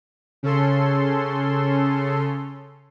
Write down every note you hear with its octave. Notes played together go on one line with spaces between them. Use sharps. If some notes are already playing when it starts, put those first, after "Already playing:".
C#3 C#4 A4 C6